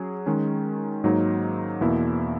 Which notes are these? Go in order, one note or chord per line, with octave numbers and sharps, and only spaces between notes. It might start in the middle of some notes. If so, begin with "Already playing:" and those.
Already playing: F#3 C#4 G#4
D#3 G#3 C#4
G#2 F#3 A#3 D#4
E2 B2 A#3 E4